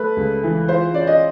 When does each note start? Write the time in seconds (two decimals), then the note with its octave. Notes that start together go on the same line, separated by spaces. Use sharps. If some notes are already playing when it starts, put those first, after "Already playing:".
Already playing: A3 B4
0.16 C#2
0.43 E3
0.68 F4 C5
0.94 C#4 D5
1.07 D#5